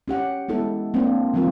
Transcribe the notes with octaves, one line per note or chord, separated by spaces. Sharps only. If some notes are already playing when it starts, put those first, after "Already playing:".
C#4 G4 F#5
G#3 B3 E4 A4
A#3 C4 D4 C5
D#3 F3 G3 C4 F4 A#4